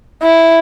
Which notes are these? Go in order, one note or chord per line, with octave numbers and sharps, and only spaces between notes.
E4